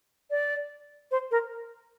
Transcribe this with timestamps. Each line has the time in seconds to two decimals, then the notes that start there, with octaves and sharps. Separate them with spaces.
0.31 D5
1.11 C5
1.31 A#4